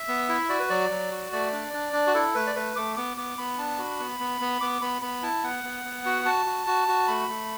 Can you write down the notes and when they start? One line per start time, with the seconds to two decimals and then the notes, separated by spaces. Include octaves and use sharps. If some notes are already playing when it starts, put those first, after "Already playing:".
Already playing: E5
0.08 B3
0.29 E4
0.49 F#4 D5
0.60 B4
0.70 F#3 D5
0.91 F#3
1.12 F#4
1.32 A3 D5
1.53 D4
1.73 D4
1.93 D4
2.07 F#4
2.14 E4 A4
2.35 A3 B4
2.47 D5
2.55 A3 B4
2.76 A3 D6
2.96 B3 D6
3.17 B3 D6
3.38 B3 B5
3.58 D4 A5
3.79 F#4 B5
3.99 B3
4.20 B3
4.41 B3
4.61 B3 D6
4.81 B3 B5
5.02 B3 B5
5.23 E4 A5
5.43 B3 F#5
5.64 B3
5.84 B3
6.06 F#4
6.25 F#4 A5
6.46 F#4
6.67 F#4
6.88 F#4
7.08 A3 B5
7.29 A3